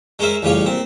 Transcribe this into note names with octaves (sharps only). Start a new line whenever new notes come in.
G#3 C#4 A#4 C5 E5
A1 C#3 G3 F4 C#5
A#2 C4